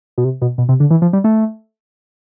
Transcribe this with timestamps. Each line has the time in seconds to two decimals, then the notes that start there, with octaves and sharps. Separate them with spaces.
0.18 B2
0.24 C3
0.42 B2
0.58 B2
0.69 C3
0.80 D3
0.91 E3
1.02 F3
1.13 G3
1.24 A3